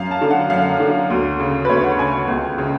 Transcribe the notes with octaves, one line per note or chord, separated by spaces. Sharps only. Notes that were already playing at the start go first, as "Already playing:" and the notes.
Already playing: F#2 F5
A5
D3
F#5
F#2 F5
D3
D2
C#3
B4
D2 C#5
F#5
C#3 G#5
C#2
C#3